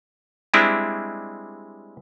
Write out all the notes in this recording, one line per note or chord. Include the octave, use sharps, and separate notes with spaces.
G3 G#3 C4 D4 E4